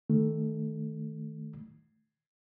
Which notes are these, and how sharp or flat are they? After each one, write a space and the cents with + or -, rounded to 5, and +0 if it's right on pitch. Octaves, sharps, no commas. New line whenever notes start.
D#3 +0 A3 +0